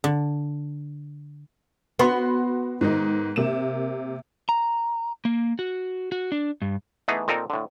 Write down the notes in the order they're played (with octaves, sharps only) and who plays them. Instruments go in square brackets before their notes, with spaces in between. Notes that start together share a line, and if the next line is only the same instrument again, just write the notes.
[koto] D3
[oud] B3 [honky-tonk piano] F#4 B5 C6
[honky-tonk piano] G#2 D#3 D#4
C3 A#3 E7
[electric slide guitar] A#5
A#3
F#4
F#4
D4
G2
[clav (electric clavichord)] E3 A3 B3 D#4 G#4
A#2 C4 D#4 A4 A#4
A2 D3